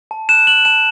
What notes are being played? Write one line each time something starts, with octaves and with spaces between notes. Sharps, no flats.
A5
F#6 E7
F#6 F#7
A5 E7